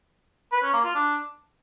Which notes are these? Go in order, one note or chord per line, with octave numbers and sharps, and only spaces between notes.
B4
C#4
A#3
F4
D4